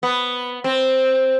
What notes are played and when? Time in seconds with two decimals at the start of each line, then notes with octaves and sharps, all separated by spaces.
0.03 B3
0.64 C4